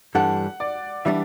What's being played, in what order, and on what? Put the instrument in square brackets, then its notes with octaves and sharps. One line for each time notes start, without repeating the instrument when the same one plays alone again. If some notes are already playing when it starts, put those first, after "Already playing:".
[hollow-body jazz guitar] G2 E3 G3 D4 A4 [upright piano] F#5
[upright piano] D5
[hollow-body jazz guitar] E3 G3 D4 [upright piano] E5